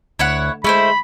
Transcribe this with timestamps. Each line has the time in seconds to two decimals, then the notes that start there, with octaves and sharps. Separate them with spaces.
0.19 D2 E4 C#5 F#5
0.64 G#3 A3 E4 C5 B5